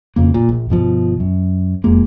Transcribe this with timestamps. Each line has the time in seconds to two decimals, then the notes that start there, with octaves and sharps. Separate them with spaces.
0.16 F2 C#3 A#3
0.34 A#2
0.49 A#1
0.70 G1 B2 F3
1.20 F#2
1.84 E1 F2 G#3 A#3